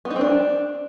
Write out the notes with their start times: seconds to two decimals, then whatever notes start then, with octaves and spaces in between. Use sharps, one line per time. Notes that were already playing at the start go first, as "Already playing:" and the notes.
0.05 B3
0.10 D#4
0.16 C4
0.21 D4